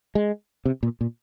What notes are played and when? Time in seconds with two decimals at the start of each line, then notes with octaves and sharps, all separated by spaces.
0.15 G#3
0.65 C3
0.83 A#2
1.01 A#2